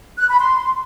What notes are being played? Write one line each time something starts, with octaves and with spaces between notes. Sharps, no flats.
F#6
B5
C6